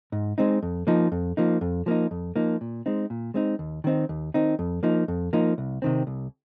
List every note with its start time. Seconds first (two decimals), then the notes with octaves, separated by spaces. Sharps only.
0.12 G#2
0.38 G#3 C4 D#4
0.62 F2
0.87 F3 A#3 D#4
1.12 F2
1.37 F3 A#3 D#4
1.61 F2
1.86 F3 A#3 D#4
2.11 F2
2.36 F3 A#3 D#4
2.61 A#2
2.86 G#3 C4 D#4
3.10 A#2
3.34 G#3 C4 D#4
3.59 D#2
3.84 D#3 C4 D#4
4.09 D#2
4.34 D#3 C4 D#4
4.59 F2
4.83 F3 A#3 D#4
5.08 F2
5.33 F3 A#3 D#4
5.58 C2
5.82 C3 D#3 C4
6.07 C2